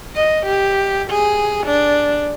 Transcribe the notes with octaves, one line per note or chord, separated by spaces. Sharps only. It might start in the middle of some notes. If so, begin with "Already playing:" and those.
D#5
G4
G#4
D4